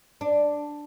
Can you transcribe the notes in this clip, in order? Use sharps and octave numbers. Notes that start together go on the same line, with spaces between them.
D4